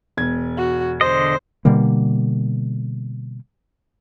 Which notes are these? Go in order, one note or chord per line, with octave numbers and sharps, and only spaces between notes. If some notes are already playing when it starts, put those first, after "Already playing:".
E1 G#6
F#4
D3 C5 D#5
B2 D3 G3 A#3